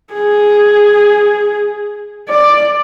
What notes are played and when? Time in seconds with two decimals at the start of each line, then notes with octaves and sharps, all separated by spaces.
0.14 G#4
2.29 D5